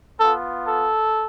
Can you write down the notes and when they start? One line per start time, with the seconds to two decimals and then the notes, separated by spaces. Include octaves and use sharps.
0.19 B3 A4
0.25 F4
0.65 A4